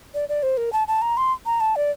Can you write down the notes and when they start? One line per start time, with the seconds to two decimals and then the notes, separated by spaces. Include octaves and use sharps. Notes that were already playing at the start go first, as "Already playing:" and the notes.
0.14 D5
0.29 D5
0.43 C5
0.57 A#4
0.73 A5
0.88 A5
1.02 A#5
1.17 C6
1.46 A#5
1.61 A5
1.76 D5